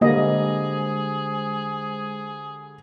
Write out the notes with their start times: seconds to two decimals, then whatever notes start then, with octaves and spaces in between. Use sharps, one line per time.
0.01 D3 G3 G#3 A#3 G#4 C5 D#5